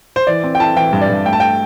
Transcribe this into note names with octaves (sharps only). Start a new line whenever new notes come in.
C5
E3 D5
C4
G5
E4 A5
E3 G5
G2
D5
G2
A3 G5
A5
G5